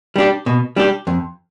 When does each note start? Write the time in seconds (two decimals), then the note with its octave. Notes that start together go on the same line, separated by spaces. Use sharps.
0.16 G3 D4 G4
0.46 B2
0.76 G3 D4 G4
1.07 F2